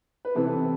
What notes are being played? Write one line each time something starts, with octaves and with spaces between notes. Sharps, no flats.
B4
C3 E3 B3 A4